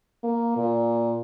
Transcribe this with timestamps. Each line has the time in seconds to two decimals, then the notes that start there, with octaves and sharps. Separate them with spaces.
0.24 A#3
0.57 A#2